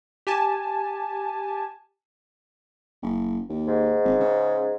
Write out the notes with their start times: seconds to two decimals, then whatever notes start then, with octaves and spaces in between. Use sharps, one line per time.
0.27 G4 G#5 A5
3.03 F#1
3.49 D#2
3.68 G#2
4.05 G#1
4.20 C#3